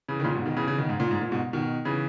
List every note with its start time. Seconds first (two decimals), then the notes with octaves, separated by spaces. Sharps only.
0.09 C#3 E3
0.20 D#3
0.24 A#2 C#3
0.35 G#2 B2
0.46 B2 D#3
0.56 C#3 E3
0.67 C#3 E3
0.78 B2 D#3
0.89 G#2
1.00 A#2
1.11 G#2
1.21 A#2
1.32 G#2 B2
1.53 B2 D#3
1.85 C#3 E3